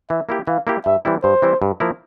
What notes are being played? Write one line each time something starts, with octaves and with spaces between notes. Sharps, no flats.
E3 E5
A#3 E4 G4
E3 F5
A#3 E4 G4
G2 E5
E3 G3 C4 E4
G2 C5
E3 G3 C4 E4
G2
F3 A#3 E4 A#4